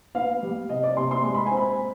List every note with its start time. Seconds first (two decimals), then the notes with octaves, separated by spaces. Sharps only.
0.15 B3 F5
0.43 G3
0.69 C3 D#5
0.83 D5
0.97 C3 C6
1.11 C6
1.24 G#3 C6
1.34 B5
1.46 C4 G#5
1.57 B5